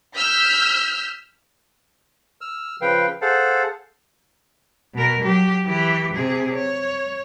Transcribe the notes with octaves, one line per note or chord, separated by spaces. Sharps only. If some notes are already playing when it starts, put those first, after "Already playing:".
E6 F6 G6 B6
E6 F6
C#3 F3 B4 F5 G5
G#4 A4 C5 F5 F#5 A5
B2 A#4
F#3 G4
E3 G4
C3 G#4
C#5